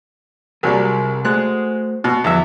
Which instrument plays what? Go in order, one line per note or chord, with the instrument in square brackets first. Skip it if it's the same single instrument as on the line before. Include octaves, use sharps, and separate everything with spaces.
[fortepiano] C2 F#3 G3 [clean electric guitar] C3 G#4 A#4
[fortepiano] G#3 F#6 [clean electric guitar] A3 F#4 C5
[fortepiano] B2
[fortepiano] E2 E5 [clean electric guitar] D3 F3 F#4